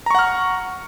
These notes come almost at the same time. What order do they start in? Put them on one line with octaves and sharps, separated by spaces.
A#5 C#6 F#5 F6